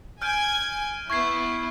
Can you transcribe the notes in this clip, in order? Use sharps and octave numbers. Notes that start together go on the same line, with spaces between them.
G#5 F6 G6 G#6 D7
B3 E4 C#6 G#6 C7